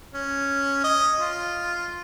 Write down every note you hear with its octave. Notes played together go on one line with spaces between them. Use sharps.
C#4
D#5
F4